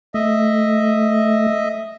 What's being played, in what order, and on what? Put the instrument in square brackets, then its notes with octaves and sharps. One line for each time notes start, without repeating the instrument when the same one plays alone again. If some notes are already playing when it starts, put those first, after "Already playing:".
[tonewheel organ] A3 [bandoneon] D#5 E5